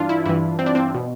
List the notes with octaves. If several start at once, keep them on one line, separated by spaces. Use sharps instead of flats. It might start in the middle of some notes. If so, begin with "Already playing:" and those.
Already playing: G2 E3 D4 F4
E4
G2 E3 E4
C4
D4
C4
B2